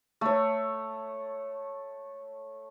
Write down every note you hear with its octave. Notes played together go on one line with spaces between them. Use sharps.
A3 C#5